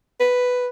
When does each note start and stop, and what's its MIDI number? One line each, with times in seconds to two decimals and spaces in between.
0.20 0.68 71